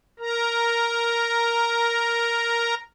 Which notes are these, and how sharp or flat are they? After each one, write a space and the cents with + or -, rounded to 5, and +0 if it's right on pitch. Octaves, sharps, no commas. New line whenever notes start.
A#4 +0 A#5 +0